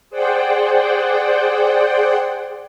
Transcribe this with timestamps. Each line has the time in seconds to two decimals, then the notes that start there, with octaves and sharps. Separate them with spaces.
0.10 G#4 C5 D5 F#5 G5